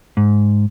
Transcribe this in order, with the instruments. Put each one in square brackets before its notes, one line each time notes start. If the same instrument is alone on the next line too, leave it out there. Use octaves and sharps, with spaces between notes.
[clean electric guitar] G#2